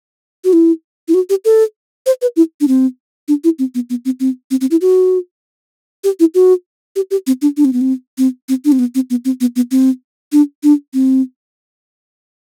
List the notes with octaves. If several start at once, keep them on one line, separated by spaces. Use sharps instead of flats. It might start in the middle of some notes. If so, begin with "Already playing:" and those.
F#4
E4
E4
F#4
G4
A4
C5
B4
E4
D4
C4
D4
E4
C4
B3
B3
C4
C4
C4
C4
E4
F#4
G4
E4
F#4
G4
G4
C4
D4
D4
C4
B3
C4
C4
C4
D4
C4
B3
C4
B3
C4
B3
B3
C4
D4
D4
C4